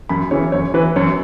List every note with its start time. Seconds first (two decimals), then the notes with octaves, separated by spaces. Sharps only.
0.09 F#2 B5
0.31 C#3 E3 C#5
0.52 F#2 C#5
0.74 E3 B4
0.96 F#2 C#5